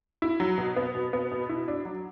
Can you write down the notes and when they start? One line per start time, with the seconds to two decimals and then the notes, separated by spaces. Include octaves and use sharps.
0.22 E4
0.40 F#3
0.58 B2
0.76 B3
0.95 B2
1.13 B3
1.32 B2
1.49 E4
1.68 D4
1.85 F#3